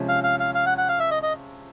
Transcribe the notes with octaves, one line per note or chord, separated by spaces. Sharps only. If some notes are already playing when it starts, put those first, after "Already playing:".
Already playing: C3 F3 G#3 C#4 F4
F5
F5
F5
F5
F#5
F#5
F5
E5
D#5
D#5